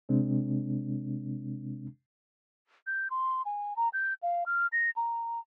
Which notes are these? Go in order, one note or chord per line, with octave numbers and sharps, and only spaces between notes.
C3 G#3 C4 D4
G6
C6
G#5
A#5
G6
F5
F6
A#6
A#5